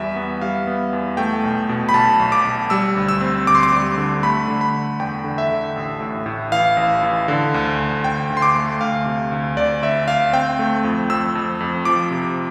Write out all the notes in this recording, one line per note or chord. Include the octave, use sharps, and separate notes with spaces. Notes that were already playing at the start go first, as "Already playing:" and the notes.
Already playing: E2 G3 E5
B3
G3 F5
B3
E2
A3 G5
B1
B2
B5
B1 A5
B1
D6
B1
G3 E6
D2
E6
C4
D2 D6
C6
D6
G3
D3
A3 B5
D3
B5
D3
E2 G5
D3
E5
D3
A1
A2
A2
E3 F5
A1
E3
D3
D2
D2
D2 G5
D2
C6
D6
A3
D2 F5
C3
D2
D2 D5
D2 E5
D2 F5
C4 G5
A3
F2
F2 E6
F2
F2
F3 D6
C3